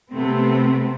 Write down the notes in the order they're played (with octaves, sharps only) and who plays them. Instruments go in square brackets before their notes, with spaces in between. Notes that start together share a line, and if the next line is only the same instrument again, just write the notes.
[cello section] C3 A3 B3 C4